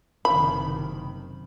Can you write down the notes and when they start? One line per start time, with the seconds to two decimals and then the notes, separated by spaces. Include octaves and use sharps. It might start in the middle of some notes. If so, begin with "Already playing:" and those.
0.25 F#1 C3 D#3 B5